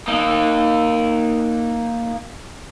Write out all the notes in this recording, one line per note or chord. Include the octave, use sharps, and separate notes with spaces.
A#3 D#4